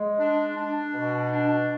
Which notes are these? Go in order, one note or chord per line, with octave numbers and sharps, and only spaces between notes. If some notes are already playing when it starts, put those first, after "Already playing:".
Already playing: G#3
D4
D4
B2
D4